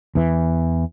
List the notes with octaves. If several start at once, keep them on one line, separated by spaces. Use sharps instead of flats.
E2 E3